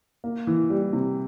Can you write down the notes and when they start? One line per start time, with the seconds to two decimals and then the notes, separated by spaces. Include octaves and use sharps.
0.24 A#3
0.47 E3
0.70 G3
0.93 C3